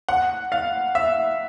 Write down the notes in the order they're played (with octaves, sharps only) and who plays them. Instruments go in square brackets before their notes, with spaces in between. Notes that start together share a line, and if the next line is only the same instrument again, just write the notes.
[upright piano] F#5
F5
E5